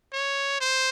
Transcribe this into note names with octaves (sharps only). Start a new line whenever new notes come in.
C#5
C5